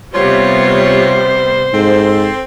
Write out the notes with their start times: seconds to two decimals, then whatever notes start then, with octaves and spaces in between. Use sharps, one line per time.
0.15 C3 G3 B3 F4 C5 C#5
1.73 G#2 C4 A4